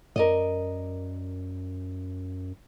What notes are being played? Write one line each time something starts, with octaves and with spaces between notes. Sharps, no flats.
F#2 A#4 D5 D#5